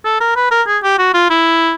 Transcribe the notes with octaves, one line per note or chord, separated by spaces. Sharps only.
A4
A#4
B4
A#4
G#4
G4
F#4
F4
E4